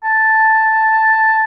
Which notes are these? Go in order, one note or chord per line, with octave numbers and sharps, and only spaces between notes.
A5